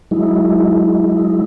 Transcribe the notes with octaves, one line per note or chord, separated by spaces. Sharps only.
F#3 G#3 D#4 E4